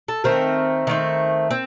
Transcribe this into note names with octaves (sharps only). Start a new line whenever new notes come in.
A4
D#3 A3 C4 A#4
D#3 A3 C4
C4